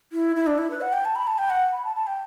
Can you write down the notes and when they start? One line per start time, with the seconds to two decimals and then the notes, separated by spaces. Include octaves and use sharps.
0.13 E4
0.36 E4
0.47 D4
0.58 E4
0.71 B4
0.81 F#5
0.93 G5
1.05 A5
1.16 B5
1.27 A5
1.38 G5
1.50 F#5
1.73 B5
1.85 A5
1.96 A5
2.07 G5